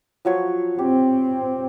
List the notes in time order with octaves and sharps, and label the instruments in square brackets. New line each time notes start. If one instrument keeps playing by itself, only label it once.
[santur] F3 F#3 C#5
[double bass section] C4 [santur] G4